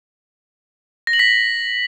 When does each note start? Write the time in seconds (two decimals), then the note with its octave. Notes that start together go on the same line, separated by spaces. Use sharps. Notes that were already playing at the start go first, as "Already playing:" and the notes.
1.07 A#6
1.13 F#7
1.19 B6